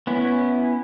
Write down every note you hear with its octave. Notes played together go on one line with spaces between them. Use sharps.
B3 C#4 E4